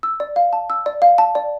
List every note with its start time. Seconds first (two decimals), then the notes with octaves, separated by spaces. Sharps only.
0.03 E6
0.20 D5
0.36 F5
0.53 A5
0.70 E6
0.86 D5
1.02 F5
1.18 A5
1.35 D5